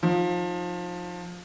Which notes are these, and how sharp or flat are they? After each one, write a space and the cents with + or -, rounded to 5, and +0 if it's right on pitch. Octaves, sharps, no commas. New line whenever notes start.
F3 +25 D#4 +0